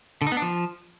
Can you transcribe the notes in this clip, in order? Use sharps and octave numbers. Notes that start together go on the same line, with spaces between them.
D3
D#4
B3
D4
F3